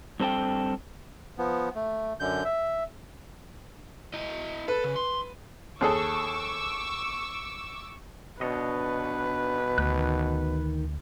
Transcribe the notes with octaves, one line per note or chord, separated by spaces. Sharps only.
G2 C4 A4 G5
F3 B3
A3
F#2 D3 G6
E5
E4 D#5
A4 B4
C#3
C6
D#2 G#4 A4 C#6 D6 E6
B2 D4 B4 C#5 D#5
D2 D#3 F#6